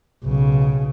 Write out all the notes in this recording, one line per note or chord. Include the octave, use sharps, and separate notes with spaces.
B1 C#3